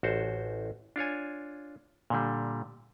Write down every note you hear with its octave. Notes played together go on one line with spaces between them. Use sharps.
A1 F#4 C5 A5
D4 F4 C#5 G#5
A#2 D3 G3